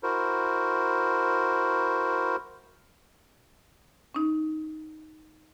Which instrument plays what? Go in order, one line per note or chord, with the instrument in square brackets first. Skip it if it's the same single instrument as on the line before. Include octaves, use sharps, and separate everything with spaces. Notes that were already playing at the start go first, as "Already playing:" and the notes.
[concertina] E4 F#4 A#4 C5
[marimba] C#4 D#4